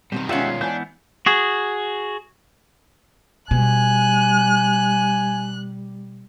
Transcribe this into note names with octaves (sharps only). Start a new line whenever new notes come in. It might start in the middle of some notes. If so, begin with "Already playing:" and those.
B2 D#3 G3 C4 C5
G#3 C#4 F4 G4 D5 E5 F#5
G#2 E3 B3 D4 C5 G#5 G6
F#4 G#4
B2 G3 G#5 F#6